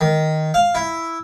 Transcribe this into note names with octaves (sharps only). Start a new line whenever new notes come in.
D#3
F5
E4